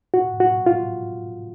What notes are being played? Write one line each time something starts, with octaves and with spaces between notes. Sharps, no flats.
F#4
F#4
F4